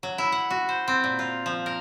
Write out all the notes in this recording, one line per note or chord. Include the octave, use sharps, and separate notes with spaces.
F#3
E4
F#5
F#4
C5
C4
A#2
F4
F3
A#4